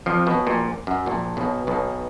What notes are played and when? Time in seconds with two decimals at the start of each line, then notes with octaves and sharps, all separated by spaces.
0.06 F2 F3
0.26 B1 B2
0.47 A#1 A#2
0.87 F#2
1.06 A#1 A#2
1.37 B1 B2
1.67 B1 B2